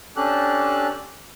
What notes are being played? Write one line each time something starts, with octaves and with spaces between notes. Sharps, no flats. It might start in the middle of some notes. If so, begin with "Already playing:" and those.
C#4 D4 G4 A4 F#6